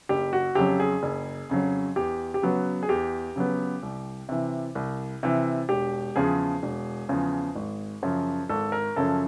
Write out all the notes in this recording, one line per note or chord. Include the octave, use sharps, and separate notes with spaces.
F#1 G4
F#4
F2 C#3 F#3 G4
G#4
F#1
F2 C#3 F#3
E2 G4
G4
C#3 F#3 B3 F#4
G#4
E2 G4
C#3 F#3 B3
C2
C3 E3
C2
C3 E3
E1 G4
E2 C#3 F3 G#4
E1
E2 C#3 F3
G#1
F#2 C#3 F3
G#1 A4
A#4
F#2 C#3 F3 A4